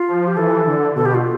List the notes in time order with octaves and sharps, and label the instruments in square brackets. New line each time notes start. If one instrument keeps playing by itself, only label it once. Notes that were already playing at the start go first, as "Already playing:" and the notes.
Already playing: [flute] F4
[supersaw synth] F3
[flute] G4
[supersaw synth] E3 [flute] A4
[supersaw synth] D3
[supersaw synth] B2 [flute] A4
[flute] G4
F4